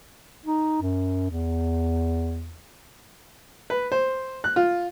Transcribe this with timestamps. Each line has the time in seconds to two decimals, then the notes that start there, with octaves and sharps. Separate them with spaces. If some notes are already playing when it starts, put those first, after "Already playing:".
0.46 D#4
0.82 F#2
1.30 E2
3.70 B4
3.92 C5
4.44 F#6
4.56 F4